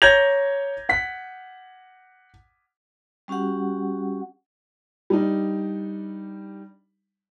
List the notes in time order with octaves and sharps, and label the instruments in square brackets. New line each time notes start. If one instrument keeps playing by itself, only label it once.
[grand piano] C#5 A#5 G6 G#6 A#6 F7
F#5 B6
[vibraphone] G3 C#4 F#4 G4 F#5
[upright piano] G3 D4 D#4